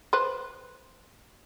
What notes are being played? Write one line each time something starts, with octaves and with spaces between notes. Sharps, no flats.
B4 C5